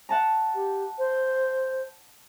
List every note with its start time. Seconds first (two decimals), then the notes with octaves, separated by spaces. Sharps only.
0.09 F#5 A5 A#5
0.55 G4
0.99 C5